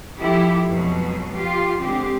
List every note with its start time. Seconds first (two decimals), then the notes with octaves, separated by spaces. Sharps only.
0.17 F3 E4 G4 A4
0.69 F2 B2 F#3 G#3
1.33 F4 G4
1.79 D3 G#3 C4 G4